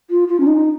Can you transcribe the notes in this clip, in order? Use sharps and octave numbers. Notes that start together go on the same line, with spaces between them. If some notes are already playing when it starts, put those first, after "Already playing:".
F4
F4
C#4
D#4